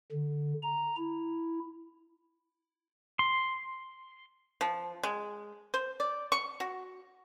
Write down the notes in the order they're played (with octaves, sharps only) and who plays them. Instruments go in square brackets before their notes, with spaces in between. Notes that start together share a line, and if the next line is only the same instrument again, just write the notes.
[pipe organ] D3
A#5
E4
[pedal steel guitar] C6
[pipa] F3
G#3
C5
D5
C#6
F#4